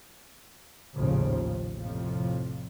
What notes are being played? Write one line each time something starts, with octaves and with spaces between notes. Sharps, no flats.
A1 D#2 A#2 C#3 F3
F2 A2 C3 F3